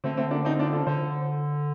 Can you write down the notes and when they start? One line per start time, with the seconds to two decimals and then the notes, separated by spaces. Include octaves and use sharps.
0.04 D3 A3 C4
0.17 A3 C4
0.31 A#3 D4
0.45 C4 D#4
0.59 D4 F4
0.73 F4 A4
0.87 D3 A4 C5